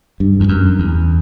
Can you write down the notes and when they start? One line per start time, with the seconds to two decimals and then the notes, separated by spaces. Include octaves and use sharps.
0.20 G2
0.40 E2
0.49 F#2
0.79 E2